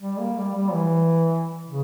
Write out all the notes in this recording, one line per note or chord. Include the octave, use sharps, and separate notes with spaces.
G3
A#3
G3
G3
E3
C#3